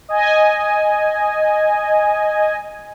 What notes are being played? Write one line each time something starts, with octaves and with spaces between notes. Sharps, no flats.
D#5 G#5